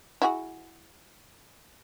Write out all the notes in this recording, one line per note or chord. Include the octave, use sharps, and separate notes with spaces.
E4 F#4 G#4